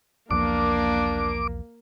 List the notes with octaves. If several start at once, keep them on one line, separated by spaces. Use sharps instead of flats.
B1 E2 F3 A#3 D4 D6